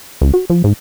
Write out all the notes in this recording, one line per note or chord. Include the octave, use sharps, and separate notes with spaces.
C#2
F#4
F3
G#2